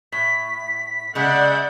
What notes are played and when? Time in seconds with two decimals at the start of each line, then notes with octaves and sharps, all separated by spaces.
0.12 A2 B6
1.15 C#3 G#3 D5 E5 F#5 G6